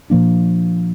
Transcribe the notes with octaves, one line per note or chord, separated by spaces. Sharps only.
A#2 F3 A#3 D4